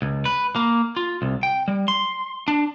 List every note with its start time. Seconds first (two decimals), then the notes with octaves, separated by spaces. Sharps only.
0.02 C#2
0.25 B4
0.56 A#3
0.97 F4
1.22 C2
1.43 G5
1.68 G3
1.88 C6
2.48 D4